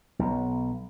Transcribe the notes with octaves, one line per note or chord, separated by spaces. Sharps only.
B1